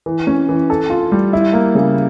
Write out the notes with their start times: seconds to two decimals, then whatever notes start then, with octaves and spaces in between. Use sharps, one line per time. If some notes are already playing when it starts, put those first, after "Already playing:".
0.06 E3
0.27 C#4
0.49 E3
0.70 A4
0.90 F4
1.12 G3
1.33 E4
1.53 A#3
1.75 C#3